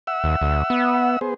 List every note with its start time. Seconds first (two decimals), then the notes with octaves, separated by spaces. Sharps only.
0.07 E5 F#5 E6
0.24 D#2
0.42 D2
0.70 B3
1.21 B3 G#4 C5